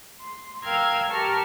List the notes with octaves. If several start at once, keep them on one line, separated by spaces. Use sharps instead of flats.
C6
A#4 F5 G5 E6 F6 G#6
G4 A4 A#4 A5 C#6 F6